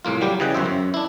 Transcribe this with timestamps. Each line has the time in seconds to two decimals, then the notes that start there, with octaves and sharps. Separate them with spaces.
0.05 C2 A2 A#3 F4
0.21 F#3 G3 G4
0.40 C#3 E3 D#5 F#5 G5
0.54 G1 F#2 C5 E5
0.66 F#2
0.94 D4 E4